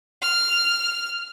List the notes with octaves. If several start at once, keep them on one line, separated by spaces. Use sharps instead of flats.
F6